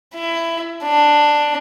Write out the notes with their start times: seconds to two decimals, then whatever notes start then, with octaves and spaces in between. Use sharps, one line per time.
0.15 E4
0.84 D4